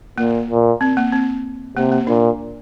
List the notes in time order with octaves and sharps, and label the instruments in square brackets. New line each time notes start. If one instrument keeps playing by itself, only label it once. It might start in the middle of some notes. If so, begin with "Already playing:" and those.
[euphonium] A#2 [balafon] A#3
[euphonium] A#2
[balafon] C4
A#3
C4
[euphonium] C3 [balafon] A#3
[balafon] A#3
[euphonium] A#2 [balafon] D4